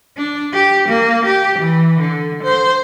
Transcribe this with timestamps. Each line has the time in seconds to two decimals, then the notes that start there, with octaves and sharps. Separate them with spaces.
0.17 D4
0.53 G4
0.89 A#3
1.25 G4
1.59 E3
2.00 D3
2.43 C5